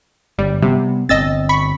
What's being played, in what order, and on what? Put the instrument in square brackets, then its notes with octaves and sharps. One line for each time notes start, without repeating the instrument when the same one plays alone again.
[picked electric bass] G1 [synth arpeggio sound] G3
[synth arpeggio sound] C3 [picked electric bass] G3 B3
[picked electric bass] G1 C4 [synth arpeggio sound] D#5 E6 A6
[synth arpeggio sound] B5 C#6 B6